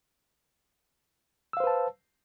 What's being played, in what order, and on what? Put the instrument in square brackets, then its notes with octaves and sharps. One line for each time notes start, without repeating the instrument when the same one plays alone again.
[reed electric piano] E6
F5
C5
B4
A5